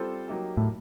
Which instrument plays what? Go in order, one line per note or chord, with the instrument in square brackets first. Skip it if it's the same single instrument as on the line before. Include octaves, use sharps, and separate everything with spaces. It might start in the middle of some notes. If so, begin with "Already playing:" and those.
Already playing: [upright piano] G3 C4 F4 A4 C5
F#3 A#3 D#4 G4
[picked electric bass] A2